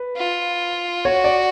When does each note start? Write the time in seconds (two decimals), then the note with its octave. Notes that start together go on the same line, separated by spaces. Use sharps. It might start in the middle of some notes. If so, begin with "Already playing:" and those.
Already playing: B4
0.16 F4
1.05 F#4 C#5
1.24 D5